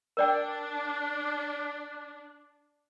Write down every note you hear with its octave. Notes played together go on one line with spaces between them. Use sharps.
D4 A#4 D5 G5